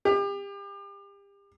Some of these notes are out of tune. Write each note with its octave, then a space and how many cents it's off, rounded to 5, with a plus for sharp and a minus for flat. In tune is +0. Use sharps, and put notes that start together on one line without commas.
G4 +35